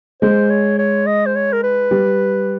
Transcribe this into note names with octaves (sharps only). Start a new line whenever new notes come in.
G#3 C5
C#5
C#5
D#5
C5
C#5
A#4
B4
G3